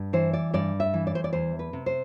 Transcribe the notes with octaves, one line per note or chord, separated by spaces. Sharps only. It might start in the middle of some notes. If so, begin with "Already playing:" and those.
Already playing: G2
E3 C5
D5
G2 D5
E5
E3
D5
C5
D5
E2 C5
B4
C3
C5